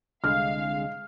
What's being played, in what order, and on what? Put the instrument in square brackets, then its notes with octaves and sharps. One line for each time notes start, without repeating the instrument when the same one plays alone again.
[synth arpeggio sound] C2 D3 G#3 [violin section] F5 [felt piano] F6